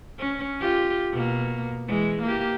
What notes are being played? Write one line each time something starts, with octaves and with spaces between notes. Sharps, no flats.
C#4
F4 G4
B2 A#3
E3 G#3
A#3 G4